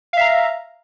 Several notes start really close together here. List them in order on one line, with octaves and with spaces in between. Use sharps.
F5 E5 A#5